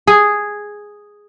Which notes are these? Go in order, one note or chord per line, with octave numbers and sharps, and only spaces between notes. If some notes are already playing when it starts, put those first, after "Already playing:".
G#4